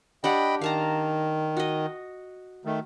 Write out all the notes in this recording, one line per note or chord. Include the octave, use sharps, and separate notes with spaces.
D4 G4 D#5 F#5 G5 B5
D#3 F5 A5 A#5
F#4 D#5
D#3 A3